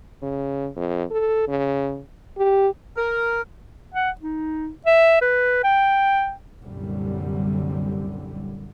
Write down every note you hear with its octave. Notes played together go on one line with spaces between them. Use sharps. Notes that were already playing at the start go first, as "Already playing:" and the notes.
C#3
F2
A4
C#3
G4
A#4
F#5
D#4
E5
B4
G5
C2 F#2 A#2 D3 G3